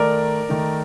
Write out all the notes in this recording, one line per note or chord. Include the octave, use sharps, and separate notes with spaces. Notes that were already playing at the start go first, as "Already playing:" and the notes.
Already playing: D#3 A3 D#4 A#4 D5
D#3 A3 D#4